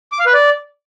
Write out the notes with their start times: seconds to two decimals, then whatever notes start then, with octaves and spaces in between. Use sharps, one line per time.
0.12 D6
0.19 F5
0.26 B4
0.34 D5